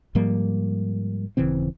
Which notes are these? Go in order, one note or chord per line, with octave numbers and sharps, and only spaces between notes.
G#2 F3 G3 A#3
D#1 C#3 E3 C4